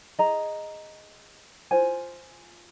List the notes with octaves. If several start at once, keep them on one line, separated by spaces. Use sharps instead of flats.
G#4 D#5 A#5
F4 C5 G#5